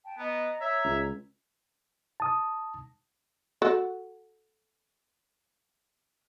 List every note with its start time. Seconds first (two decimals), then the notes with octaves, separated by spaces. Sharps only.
0.05 G5 A5
0.18 B3 D#5 A#5
0.61 C#5 E5 A#5
0.84 C#2
2.20 A5 D#6
3.62 F#4 A4 F#5